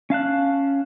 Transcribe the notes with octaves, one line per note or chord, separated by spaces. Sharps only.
C#4 F5 A5 F#6